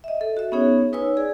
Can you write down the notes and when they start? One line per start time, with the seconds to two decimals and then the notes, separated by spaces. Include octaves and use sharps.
0.04 D#5 E5
0.21 A4
0.37 F#4 E5
0.52 B3 C#4 D#4 G#4 C#5
0.93 D#4 B4 C#5 G#5 E6
1.17 G#4 D5